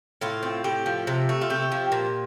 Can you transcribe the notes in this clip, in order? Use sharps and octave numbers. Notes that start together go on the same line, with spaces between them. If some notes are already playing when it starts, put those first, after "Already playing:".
A2 F4
C4
A2 G4
F3
C3
A3
F4
C3 G4
F3
A#2